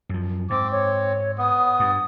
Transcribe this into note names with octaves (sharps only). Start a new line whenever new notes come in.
F#2 F3
G#2 C4 D6
C#5
B3 D#6
G2